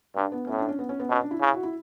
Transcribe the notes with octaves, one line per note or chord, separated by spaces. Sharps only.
G2 D4
B3
A2 C#4
D4
C#4
B3
C#4
B3
B2 C#4
D4
E4
C#3
F#4
E4